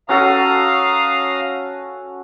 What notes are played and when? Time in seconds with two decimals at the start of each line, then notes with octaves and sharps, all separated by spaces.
0.09 C#4 F#4 A4 F5 A#5 D#6